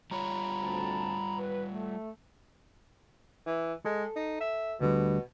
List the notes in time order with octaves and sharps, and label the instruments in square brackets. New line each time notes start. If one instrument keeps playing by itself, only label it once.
[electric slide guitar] G3 F4 C#5 [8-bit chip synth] A#5 B5
[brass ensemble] D2 C4 A5
B4
A3
[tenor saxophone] E3
[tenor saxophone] G#3 [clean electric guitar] A4
[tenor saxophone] D#4
E5
[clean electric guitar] D2 D3 G3 [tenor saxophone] B2